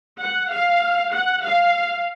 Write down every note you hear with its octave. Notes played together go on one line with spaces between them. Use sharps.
F#5
F5
F#5
F5